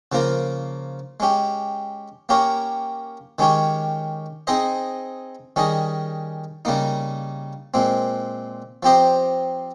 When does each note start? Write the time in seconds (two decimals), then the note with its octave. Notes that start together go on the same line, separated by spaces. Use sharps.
0.12 C#3 F3 A#3 F4 A#4
1.20 G#3 C#4 G4
2.29 A#3 C#4 G4 A#4 C#5
3.39 D#3 G#3 C#4 G4 C#5
4.47 C4 D#4 G#4 C5 D#5
5.56 D#3 G3 C#4 G#4 D#5
6.65 C#3 G3 A#3 D#4
7.74 A#2 G#3 C4
8.83 F3 C4 G4 C5 D#5